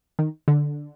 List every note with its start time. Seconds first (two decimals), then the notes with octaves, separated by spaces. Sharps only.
0.19 D#3
0.48 D3